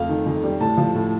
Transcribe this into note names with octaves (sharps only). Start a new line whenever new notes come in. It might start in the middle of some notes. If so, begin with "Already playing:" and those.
Already playing: F2 A3 F5
D#3
F2
G3
A2 A5
F3
A2